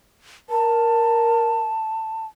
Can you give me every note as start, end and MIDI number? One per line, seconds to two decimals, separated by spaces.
0.50 1.70 70
0.50 2.26 81